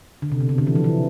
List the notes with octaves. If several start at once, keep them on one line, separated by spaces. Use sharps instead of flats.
D3
C3
B2
C3
D3
E3
F3
E3